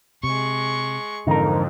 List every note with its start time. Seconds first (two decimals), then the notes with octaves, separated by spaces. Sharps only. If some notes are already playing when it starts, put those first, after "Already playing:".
0.23 C3 G#3 C#6
1.27 F2 G#2 D3 E3 D#4 A#4